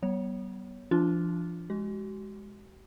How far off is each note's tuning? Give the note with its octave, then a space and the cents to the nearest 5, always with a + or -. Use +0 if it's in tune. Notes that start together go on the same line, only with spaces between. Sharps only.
G3 -45 B3 -15 C#5 +0
F3 -35 D4 +0 F4 +0
G#3 -5 F#4 +45